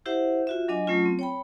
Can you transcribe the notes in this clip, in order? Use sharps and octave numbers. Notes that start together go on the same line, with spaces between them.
E4 G4 C5 E5 F#5
F4 F#4 E5
F#3 D4 D#5 G#5
F#3 A3 C#4 F4
C4
C#5 G5 B5